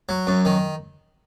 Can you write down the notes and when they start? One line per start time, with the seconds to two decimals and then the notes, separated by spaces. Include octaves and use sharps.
0.09 F#3
0.27 F#2
0.45 D#3